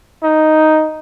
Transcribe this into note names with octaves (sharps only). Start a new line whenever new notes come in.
D#4